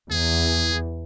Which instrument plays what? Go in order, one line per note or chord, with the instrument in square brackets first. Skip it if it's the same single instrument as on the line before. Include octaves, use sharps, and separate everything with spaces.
[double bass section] E2 [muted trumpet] G#4